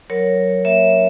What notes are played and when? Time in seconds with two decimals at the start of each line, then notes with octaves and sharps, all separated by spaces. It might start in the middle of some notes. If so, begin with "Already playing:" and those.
0.10 F#3 A#4 C#5
0.37 F#3
0.65 A#3 C#5 E5
0.92 C#4